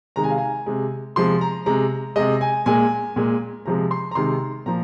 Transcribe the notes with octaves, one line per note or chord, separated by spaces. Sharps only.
C3 D#3 G#3 A#5
G#5
F5
G#5
C3 G#3
C3 F3 G#3 C6
A#5
C3 G#3 A#5
C3 G#3 D#5
G#5
A#2 G#3 G#5
A#2 G#3
C3 F3 G#3 A#5
C6
A#5
C3 D#3 G#3 C6
A#2 F3 A#5